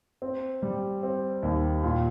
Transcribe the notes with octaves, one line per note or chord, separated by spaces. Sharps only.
C4
G3
C4
D#2
A#2